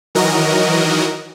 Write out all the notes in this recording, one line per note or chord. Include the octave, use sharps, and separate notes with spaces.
D#3 E3 F#3 F#4 A#4 D#5